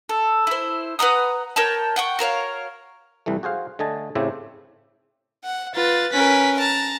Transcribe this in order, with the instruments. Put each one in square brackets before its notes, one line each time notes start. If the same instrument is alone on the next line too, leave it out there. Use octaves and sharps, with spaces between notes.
[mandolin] A4
E4 C5
B4 F#5 A#5 D#6
A#4 C#5 G5 A5
F#5 G5 C#6
F#4 A#4 C#5 F5
[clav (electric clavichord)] C2 E3 G3 A3
F#4 G#4 C5 F5
D3 A3 D#5 G#5 A5
A2 C#3 A3 C4 E4 G4
[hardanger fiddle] F#5
[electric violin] F4 A6 [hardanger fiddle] B4
[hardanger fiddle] C#4 A#4 [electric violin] B4 B6
[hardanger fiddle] A5 [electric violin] A#5